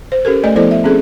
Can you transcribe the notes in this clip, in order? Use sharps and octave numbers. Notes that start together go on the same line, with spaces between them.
C5
C#4 G4 A4 A#4
A3 D5 D#5 G#5
F3 B3 E4 A4 C5 D5
E5
C4 C#4 G#4 A4